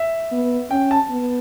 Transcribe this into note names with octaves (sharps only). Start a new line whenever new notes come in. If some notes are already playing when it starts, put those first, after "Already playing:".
Already playing: E5
B3
C#4 G5
A5
B3